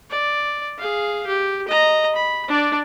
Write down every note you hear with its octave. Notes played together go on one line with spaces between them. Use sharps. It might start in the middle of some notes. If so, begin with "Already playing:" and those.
D5
G#4 F5
G4
D#5 A#5
B5
D4 D5